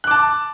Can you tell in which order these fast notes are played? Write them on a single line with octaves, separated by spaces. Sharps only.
F#6 D6 A5